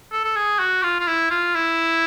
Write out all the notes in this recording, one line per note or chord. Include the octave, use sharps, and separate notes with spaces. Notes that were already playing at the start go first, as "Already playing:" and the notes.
A4
A4
G#4
F#4
F4
F4
E4
F4
E4